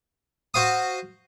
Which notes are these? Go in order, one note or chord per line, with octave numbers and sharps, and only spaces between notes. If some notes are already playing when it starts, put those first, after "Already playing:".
F#4 C5 F5 D#6